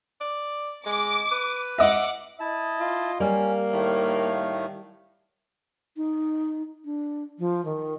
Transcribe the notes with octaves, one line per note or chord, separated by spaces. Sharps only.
D5
G#3 D6
B4
D#5 E5 F#5 D6
E4 D#5 A5
F4
G3 A#3 C#4 F5
A2 D#3 A3
D#4
D4
F3
D#3